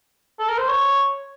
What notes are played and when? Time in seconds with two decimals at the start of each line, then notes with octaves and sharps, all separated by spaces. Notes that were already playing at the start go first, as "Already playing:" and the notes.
0.40 A4
0.49 A#4
0.58 C5
0.68 C#5